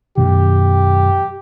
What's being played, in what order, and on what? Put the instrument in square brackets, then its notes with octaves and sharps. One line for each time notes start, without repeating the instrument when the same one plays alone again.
[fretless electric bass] F#2 B2 D#3 [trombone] G4